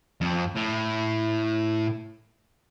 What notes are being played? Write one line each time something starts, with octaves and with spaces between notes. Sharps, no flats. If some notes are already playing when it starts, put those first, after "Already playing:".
F2
A2